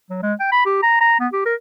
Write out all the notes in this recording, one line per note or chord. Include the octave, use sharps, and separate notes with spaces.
F#3
G#3
G5
B5
G4
A#5
A#5
B3
G4
A#4